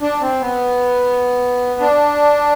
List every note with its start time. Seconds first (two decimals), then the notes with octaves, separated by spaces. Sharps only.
0.01 D4
0.21 C4
0.41 B3
1.80 D4